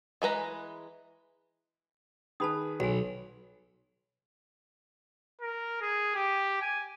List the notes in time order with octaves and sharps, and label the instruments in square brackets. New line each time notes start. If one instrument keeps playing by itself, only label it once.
[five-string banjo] E3 G#3 B4 A#5
[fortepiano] D#3 G#4 B4 [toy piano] A5 B5 D#6
[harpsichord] B1 [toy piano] F#4 G#5
[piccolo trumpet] A#4
G#4
G4
G#5